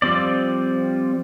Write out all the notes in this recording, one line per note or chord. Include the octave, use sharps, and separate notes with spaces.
F3 G3 C4 D5